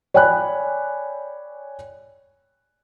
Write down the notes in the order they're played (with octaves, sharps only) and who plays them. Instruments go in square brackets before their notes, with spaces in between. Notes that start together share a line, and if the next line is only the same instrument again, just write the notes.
[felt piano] C#5 D5 G5 G#5 B5 F#6